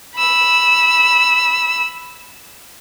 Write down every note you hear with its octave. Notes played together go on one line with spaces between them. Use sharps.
B5 E6